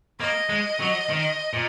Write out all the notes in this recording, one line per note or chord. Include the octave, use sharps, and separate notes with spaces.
A#3 D#5
G#3
F#3
D#3
A#2